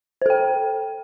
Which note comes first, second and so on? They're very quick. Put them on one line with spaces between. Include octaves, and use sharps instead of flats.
C5 A4 G5